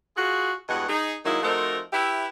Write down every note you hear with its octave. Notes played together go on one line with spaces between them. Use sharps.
F4 F#4 G#4
E2 G2 G#3 F#4 D#5 F#5
D#4 G#4
D#3 F#3 G#3 A#3 D#4 E4
F3 A3 C4 D#4 F#4 A#4
E4 G4 B4 E5